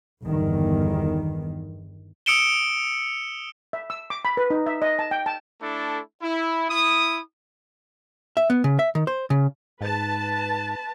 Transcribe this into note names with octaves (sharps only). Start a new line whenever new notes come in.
G1 E2 D#3
D#6 E6 C#7 D7 E7 G7
E5
E6
D6
B5
B4
D#4
E5
D#5
A5
G5
A5
A3 D4 E4 A4
E4
E4 D#6
E5
B3
C#3
E5
D#3
C5
C#3
G#2 B4 A5